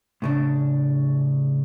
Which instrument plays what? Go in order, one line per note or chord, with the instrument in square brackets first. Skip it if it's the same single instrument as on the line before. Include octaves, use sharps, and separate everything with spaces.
[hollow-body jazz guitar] A2 C#3 D4